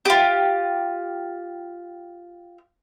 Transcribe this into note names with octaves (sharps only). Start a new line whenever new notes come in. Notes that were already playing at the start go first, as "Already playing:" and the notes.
F4 G4